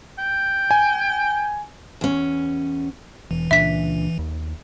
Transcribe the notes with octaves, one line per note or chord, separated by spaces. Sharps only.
G5
G#5
E2 C#4
E1 E3
C#2 A#2 D4 E5 B6
D#2